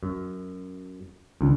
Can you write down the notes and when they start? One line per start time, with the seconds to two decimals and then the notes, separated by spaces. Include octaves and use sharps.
0.03 F#2
1.41 C#2 D#3 D4 F4